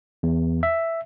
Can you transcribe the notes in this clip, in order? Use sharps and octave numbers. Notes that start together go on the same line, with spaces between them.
E2
E5